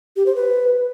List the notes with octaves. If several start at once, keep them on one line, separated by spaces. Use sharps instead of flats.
G4
C5
B4